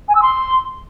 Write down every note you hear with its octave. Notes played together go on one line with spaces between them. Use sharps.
G#5
E6
C6